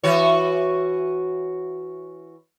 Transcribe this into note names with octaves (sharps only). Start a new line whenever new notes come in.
E3 F#4 C#5